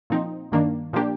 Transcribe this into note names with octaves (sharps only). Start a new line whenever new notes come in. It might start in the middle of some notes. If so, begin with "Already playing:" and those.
A#2 F3 C4 D#4
G2 D#3 A#3 D4
A#2 F3 A#3 D4 G4